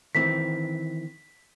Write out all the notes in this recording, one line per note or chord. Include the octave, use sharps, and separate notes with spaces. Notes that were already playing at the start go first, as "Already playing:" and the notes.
D#3 E3 C4 B6